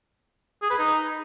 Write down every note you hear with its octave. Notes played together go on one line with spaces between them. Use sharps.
G#4
B4
D#4